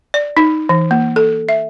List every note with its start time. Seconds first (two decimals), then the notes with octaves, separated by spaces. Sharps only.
0.14 D5
0.37 D#4
0.69 E3
0.91 A#3
1.16 A4
1.49 E5